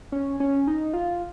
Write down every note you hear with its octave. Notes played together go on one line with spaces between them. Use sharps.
C#4
C#4
D#4
F4